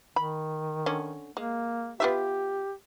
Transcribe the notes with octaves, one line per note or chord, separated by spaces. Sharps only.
D#3 B5
D3 C#4
G#3 A#3
B3 F4 G4 E5